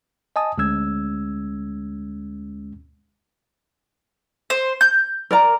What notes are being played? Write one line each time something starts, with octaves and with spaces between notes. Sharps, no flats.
D#5 G#5 A5 D#6
D2 G#3 C#4 E6 G#6
C5
G6
A#4 D5 A#5